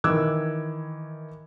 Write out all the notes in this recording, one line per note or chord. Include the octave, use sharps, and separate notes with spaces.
D#3 E3 D6 E6 F#6 G#6